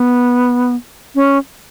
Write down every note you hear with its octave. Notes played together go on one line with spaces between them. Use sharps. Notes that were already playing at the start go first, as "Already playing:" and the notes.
Already playing: B3
C#4